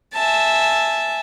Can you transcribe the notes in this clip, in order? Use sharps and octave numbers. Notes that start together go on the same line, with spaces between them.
E5 G#5 A5